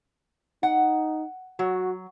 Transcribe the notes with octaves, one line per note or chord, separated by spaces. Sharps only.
D#4 F#5
F#3 F#4